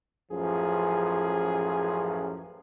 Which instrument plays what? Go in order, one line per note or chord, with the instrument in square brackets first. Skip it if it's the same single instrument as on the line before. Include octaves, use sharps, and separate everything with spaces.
[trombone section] A1 F#2 F3 [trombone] G#4